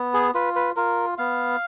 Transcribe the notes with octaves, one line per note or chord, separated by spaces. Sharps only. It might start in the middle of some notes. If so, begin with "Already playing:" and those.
Already playing: B3
G#4
F4 B4
B4
F4 A#4
B3 F5